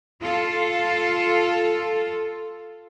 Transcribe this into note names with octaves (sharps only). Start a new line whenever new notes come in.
F4 A4